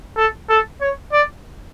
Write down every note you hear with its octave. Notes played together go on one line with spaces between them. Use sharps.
A4
A4
C#5
D5